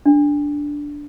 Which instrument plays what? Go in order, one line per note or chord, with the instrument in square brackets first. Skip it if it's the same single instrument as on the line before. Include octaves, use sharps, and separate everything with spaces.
[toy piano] D4